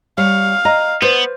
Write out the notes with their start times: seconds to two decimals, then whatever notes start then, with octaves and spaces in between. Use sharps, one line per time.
0.18 G3 C#5 F5
0.65 D#5 A#5
1.02 B3 B4 C5 D5